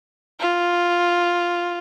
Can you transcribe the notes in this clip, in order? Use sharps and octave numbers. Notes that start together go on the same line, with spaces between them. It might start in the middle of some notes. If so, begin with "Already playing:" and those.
F4